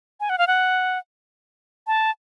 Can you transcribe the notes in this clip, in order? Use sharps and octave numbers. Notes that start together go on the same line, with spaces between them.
G#5
F#5
F5
F#5
A5